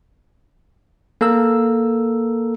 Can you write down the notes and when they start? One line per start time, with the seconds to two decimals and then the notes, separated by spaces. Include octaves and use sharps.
1.21 A#3 A4 A#4 E6